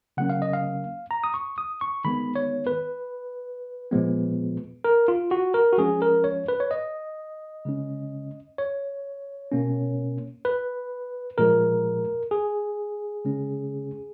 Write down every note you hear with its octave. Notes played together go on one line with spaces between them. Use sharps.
C#3 F#3 A#3 C#4 F#5
F5
D#5
F5
A#5
D#6
C#6
D#6
C#6
D#3 G#3 B3 B5
C#5
B4
A#2 F3 G#3 B3
A#4
F4
F#4
A#4
F#4
F3 G#3 C#4 G#4
A#4
C#5
B4
C#5
D#5
C#3 G#3 C#4
C#5
B2 A#3 C#4
B4
A#2 F3 G#3 A#4
G#4
C#3 G#3 C#4